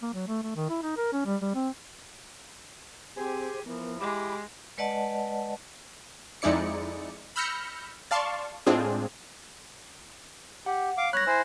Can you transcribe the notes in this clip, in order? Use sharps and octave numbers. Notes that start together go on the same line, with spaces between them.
A#3
F#3
A3
A3
D#3
E4
D#4
A#4
C#4
G3
G3
C4
C4 G4 G#4 C5 G#5
E3 F3 B3 A#4
G#3 G4 B5 D6
G#3 B4 D5 D#5 F#5 A5
F2 G#3 D#4 E4 D5 C#7
B5 E6 F6 G6 A#6 C#7
D5 F5 A5 C6 C#6
A2 G#3 C4 D4 F4 G#4
G4 F#5
F5 D6
B1 G2 C#5 B5 F#6 A#6
E4 C5 G#5